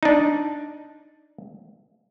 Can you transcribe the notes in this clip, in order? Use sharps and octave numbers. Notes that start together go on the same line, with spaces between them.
D4 D#4